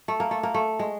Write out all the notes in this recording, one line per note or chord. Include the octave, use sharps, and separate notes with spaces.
A3
A#3
A3
A#3
A3
G#3